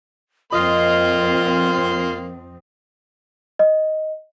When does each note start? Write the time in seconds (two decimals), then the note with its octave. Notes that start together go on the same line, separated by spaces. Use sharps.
0.52 F2 F3 A#3 C4 F4 D#5 C6
3.59 D#5